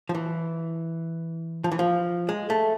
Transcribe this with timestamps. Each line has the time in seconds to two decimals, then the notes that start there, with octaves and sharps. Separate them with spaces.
0.09 F3
0.15 E3
1.64 F3
1.72 E3
1.79 F3
2.29 G#3
2.50 A3